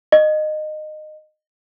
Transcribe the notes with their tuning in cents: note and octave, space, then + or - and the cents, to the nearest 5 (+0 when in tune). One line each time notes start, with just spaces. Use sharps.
D#5 -20